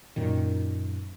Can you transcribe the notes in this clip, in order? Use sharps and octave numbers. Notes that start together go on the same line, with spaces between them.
F#2 A#2 D#3